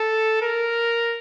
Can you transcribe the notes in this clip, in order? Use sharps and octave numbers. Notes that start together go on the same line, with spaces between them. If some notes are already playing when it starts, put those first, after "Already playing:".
Already playing: A4
A#4